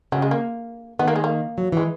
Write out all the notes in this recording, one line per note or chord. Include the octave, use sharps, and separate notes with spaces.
C#3 F#3
G#3
A#3
D#3 B3
A#3
G#3
A#3
F#3
E3 G#3